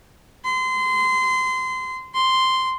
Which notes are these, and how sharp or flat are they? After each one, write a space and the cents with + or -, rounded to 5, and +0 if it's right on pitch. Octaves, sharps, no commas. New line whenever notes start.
C6 -25
C6 -5